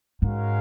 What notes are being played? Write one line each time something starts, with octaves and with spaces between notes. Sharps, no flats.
G#2 G#3 C#4 F#4 A#4 F5